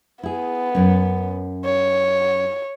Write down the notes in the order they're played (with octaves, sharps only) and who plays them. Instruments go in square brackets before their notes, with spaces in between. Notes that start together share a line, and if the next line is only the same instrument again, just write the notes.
[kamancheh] B3 [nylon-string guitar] E4 G#4
[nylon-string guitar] F#2 C#4
[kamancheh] C#5